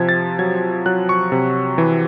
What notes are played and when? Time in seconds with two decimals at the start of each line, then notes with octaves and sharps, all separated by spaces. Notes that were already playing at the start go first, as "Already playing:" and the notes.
Already playing: C3 F3 G#6
0.09 A6
0.39 F#3 G#6
0.86 F#3 F#6
1.09 C#6
1.32 C3
1.78 E3